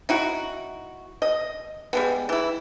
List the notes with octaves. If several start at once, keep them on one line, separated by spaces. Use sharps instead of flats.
D#4 E4 F#4
D#5
G3 G#3 B3
E3 E4